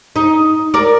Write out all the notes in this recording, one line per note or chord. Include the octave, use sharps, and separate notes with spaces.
D#4
A#4 D5